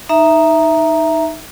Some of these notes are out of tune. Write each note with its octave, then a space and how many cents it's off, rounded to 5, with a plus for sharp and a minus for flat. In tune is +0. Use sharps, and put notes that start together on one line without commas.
D#4 -5 E5 +0 A#5 +0